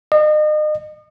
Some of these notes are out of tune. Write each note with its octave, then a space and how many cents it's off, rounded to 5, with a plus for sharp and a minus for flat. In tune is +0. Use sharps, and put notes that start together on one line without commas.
D#5 -35